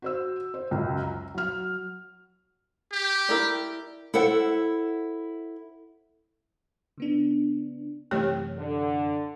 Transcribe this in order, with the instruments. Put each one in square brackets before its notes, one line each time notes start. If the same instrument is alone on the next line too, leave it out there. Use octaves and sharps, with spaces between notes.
[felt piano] F#4 C5 E6
C5
C#2 F#2
A#5
F#3 F6
[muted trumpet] G4
[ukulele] E4 A#4 D5
[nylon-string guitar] E4 A4 C5 F#5
[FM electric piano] C#3 B3 D4
[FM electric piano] F#2 C3 E3 [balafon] A3 G4 C#5
[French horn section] D3